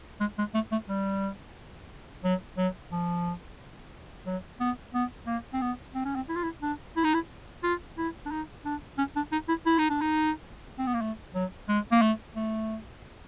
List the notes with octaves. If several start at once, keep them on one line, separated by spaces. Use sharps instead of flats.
G#3
G#3
A3
A3
G3
F#3
F#3
F3
F#3
B3
B3
A#3
C4
B3
C4
C#4
C4
E4
F4
E4
D4
E4
D#4
E4
F4
E4
D4
D#4
D4
C#4
D4
D#4
E4
E4
D#4
D4
D#4
C4
B3
A#3
A3
F#3
G#3
A#3
A3
A3